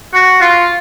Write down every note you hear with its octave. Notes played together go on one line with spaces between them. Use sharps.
F#4
F4